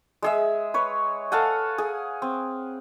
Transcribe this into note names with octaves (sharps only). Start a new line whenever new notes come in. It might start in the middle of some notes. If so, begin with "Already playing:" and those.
G#3 G#4 E5
B4 C#5
A4 F5 F#5 G#5
G#4
C4